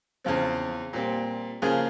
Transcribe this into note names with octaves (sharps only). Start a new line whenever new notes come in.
E2 C#3 F3 C4
A#2 G3 C4
C#3 F3 A#3 F4 G#4